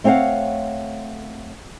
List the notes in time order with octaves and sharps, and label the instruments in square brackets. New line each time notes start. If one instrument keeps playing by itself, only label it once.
[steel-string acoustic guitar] A3 C4 C#5 F5 F#5